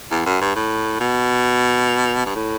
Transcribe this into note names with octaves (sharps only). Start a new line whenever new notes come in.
E2
F#2
G2
A2
B2
G2
A2